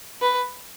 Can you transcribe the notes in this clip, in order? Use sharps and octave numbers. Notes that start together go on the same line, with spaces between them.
B4